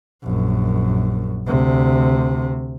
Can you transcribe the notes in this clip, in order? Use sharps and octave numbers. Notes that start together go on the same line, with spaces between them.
A#1 F#2
D2 C3